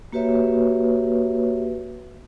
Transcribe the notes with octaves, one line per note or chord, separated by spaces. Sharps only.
A#3 F#4 G4 B4 C#5 E5